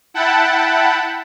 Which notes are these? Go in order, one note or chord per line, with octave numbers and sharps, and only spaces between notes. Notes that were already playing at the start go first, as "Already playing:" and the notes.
E4 F#5 G5 A5 B5